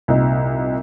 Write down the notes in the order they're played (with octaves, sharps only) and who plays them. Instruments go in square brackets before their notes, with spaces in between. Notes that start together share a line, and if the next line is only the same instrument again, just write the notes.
[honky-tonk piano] C2 A#2 D#4